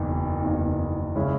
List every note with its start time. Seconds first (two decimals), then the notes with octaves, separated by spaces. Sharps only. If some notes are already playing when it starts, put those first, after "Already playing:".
Already playing: F#1 E2 D#3
0.42 F#1 E2 D#3
1.16 C#3 G#3 C#4 E4